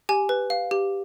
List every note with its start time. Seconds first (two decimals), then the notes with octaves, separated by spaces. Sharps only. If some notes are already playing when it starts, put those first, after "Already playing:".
0.09 G4 G#5
0.29 B4
0.50 F5
0.71 G4